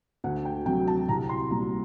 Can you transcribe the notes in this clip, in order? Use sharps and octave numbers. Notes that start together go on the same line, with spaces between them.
D2 F#5
G5
C3 F#3 G5
A5
C2 A#5
C6
A#2 G3 A#5